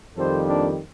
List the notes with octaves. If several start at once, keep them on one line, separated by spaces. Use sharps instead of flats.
F2 D#3 G3 A4 C5
A#3 D4